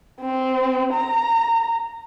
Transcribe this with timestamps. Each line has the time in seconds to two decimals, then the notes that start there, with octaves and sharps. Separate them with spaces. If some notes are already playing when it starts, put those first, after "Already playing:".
0.21 C4
0.93 A#5